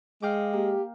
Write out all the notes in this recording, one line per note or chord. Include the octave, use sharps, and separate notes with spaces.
G#3 F5 G5 D6
A#3 G4